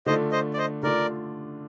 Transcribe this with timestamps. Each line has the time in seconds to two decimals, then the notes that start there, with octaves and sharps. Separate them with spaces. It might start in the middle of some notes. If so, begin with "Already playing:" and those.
0.06 D3 A3 D4 F4 C5 D#5
0.32 C5 D#5
0.53 D5
0.58 C5 D#5
0.83 D3 A3 D4 F4 A#4 D5